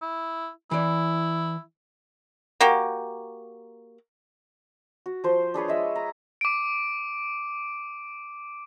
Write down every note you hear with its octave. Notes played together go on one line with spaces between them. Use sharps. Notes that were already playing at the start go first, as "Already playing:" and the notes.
E4
E3 E4 D5
A#3 F#4 G4
F#4
F3 C5
D4 G#4 B4 C#5
G#3 D#5 E5
A#5
D6 D7